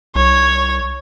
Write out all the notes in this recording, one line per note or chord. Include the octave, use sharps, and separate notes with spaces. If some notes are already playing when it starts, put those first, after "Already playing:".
C2 C#5